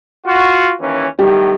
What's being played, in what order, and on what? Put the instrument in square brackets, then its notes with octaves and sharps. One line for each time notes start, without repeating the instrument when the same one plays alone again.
[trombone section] F4 F#4
D#2 E3 C#4
[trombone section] B1 A2 D#3 [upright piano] G3 G4